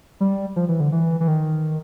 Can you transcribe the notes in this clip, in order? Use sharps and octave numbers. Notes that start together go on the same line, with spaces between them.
G3
F3
E3
D3
E3
E3
D#3